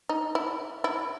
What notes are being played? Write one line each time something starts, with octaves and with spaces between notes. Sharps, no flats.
D#4
E4
E4